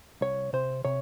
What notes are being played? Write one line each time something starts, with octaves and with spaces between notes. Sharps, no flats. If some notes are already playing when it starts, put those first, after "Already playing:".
C2 C#5
C3 C5
C3 C#5